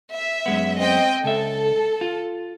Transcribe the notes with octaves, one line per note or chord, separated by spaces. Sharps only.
E5
F#2 G#3 B3
C4 D#5 G5
C#2 A4 E5
F4